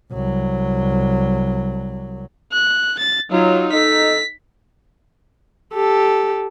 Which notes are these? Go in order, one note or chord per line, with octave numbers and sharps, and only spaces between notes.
C2 F#3
F#6
A6
F#3 D#4 F4
D#4 A4 B6
G4 A4